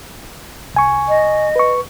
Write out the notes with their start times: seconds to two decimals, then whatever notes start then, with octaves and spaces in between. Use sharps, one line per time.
0.74 C2 G#5 C#6
1.08 D#5
1.56 B4 C#6